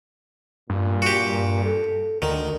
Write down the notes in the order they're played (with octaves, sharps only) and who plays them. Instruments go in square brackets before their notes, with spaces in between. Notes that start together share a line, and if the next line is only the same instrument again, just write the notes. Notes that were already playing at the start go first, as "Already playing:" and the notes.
[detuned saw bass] G2 [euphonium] A#2
[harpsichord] F#4 G4
[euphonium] A4
[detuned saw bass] D2 [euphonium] D3 [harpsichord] D#3